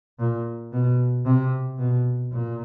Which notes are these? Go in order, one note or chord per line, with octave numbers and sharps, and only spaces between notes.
A#2
B2
C3
B2
A#2